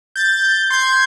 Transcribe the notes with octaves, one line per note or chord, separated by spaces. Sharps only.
G6 A6
C6 G6 G#6